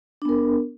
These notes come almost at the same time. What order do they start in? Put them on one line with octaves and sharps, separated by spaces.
D4 B3 A#4